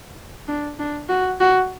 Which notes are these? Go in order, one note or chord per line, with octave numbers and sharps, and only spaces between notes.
D4
D4
F#4
F#4